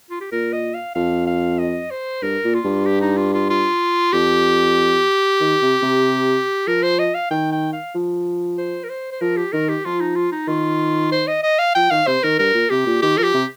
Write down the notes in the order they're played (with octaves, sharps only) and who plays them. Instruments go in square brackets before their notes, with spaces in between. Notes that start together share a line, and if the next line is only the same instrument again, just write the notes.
[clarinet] F4
G4
[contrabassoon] A#2 [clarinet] A#4
[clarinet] D#5
F5
[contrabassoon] F2 [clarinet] F5
[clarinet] F5
D#5
C5
[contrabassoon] G2 [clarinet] A#4
[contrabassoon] A#2
[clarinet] F4
[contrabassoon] G2
[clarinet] G4
D#4
F4
F4
F4
[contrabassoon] F2 [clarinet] G4
[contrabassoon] D#3
C3
C3
[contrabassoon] F3 [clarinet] A#4
[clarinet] C5
D#5
F5
[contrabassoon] D#3 [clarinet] G5
[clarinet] G5
F5
[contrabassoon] F3
[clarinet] C5
A#4
C5
C5
[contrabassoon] F3 [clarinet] A#4
[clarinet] G4
[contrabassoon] D#3 [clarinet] A#4
[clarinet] G4
[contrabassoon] F3 [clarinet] F4
[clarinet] D#4
F4
D#4
[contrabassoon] D#3 [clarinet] F4
[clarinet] C5
D#5
D#5
F5
[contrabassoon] F3 [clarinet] G5
[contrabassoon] D#3 [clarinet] F5
[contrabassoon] C3 [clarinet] C5
[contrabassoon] D#3 [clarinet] A#4
[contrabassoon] G2 [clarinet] A#4
[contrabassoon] A#2
[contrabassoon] C3 [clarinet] G4
[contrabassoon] A#2
[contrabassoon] D#3 [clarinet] G4
[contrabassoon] F3 [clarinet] A#4
[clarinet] G4
[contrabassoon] C3